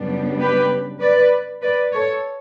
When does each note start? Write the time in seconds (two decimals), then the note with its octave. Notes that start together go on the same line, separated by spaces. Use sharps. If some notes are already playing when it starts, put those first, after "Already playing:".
Already playing: F#2 C#3 G3 B3 D4
0.39 G4 B4
1.00 B4 D5
1.62 B4 D5
1.93 A4 C#5